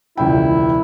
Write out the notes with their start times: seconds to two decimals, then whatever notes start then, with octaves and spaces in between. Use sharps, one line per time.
0.18 E1 C#2 E4 G5